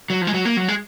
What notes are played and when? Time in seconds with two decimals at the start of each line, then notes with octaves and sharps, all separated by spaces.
0.10 F#3
0.21 F3
0.27 G#3
0.34 F#3
0.45 A#3
0.57 F#3
0.68 G#3